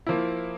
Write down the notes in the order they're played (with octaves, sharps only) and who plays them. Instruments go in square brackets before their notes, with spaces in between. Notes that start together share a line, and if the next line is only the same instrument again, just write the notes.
[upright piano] F3 A#3 E4